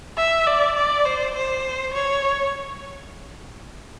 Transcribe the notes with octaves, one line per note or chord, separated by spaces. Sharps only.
E5
D5
D5
C5
C5
C#5